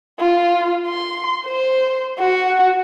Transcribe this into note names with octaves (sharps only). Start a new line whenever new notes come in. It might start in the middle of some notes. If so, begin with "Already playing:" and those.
F4
C6
C5
F#4